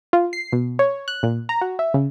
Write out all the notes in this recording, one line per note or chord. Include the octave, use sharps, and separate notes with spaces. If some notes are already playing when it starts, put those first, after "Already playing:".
F4
C7
B2
C#5
F#6
A#2
A#5
F#4
E5
C#3